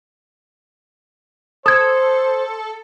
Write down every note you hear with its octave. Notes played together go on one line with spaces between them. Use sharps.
A4 C5 D#6 G#6